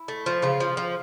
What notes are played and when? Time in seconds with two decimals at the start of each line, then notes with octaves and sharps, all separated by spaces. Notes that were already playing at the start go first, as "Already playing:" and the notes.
Already playing: E4
0.08 A3
0.26 F3
0.42 C#3 F4
0.60 F3
0.77 F3